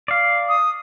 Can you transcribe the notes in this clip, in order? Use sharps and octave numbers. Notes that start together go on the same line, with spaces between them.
D5 F5
D#6